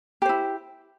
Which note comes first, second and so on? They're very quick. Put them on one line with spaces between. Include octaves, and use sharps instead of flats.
G4 C5 E4